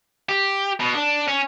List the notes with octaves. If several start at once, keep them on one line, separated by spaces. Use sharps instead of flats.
G4
B2
D4
C#4